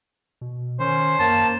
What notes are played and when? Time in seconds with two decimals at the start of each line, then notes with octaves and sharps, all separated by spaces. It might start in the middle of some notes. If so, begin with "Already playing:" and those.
0.41 B2
0.80 D#3 C#4 C5
1.19 F#2 A#3 A5